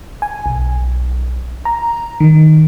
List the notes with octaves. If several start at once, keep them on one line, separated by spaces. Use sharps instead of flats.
G#5
B1
A#5
D#3